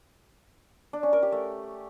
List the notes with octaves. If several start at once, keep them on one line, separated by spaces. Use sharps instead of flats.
D4
C#4
A#4
G4
A3